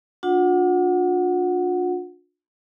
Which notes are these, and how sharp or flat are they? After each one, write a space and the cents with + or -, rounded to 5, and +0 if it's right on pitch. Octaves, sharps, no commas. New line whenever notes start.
D4 +0 F4 +40 F#5 +0